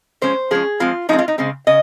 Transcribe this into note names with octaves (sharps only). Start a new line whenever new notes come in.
F3 G#3 C#4 C5
F3 G#3 C#4 G#4
F3 G#3 C4 F4
F3 G#3 C4 D#4
F4
D#4
C#3 G#3 C4
C#3 D#5